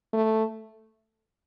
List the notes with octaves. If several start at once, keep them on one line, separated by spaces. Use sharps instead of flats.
A3